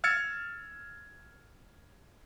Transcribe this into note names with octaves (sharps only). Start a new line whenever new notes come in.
E6 F6 G#6 A6 C#7